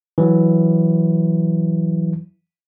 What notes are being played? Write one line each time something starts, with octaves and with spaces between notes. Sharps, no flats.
E3 F#3